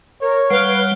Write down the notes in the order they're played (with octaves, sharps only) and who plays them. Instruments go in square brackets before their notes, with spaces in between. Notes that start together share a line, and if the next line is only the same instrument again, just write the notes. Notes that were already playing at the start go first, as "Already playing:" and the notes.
[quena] A#4 [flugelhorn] C#5
[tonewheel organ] G3 F#5 [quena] B4 [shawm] F5